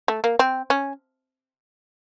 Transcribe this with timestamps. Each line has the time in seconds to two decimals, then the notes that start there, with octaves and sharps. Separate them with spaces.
0.08 A3
0.24 A#3
0.39 C4
0.70 C#4